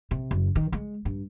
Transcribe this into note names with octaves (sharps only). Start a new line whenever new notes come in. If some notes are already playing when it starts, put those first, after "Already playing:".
C3
F#1
D#3
G#3
G2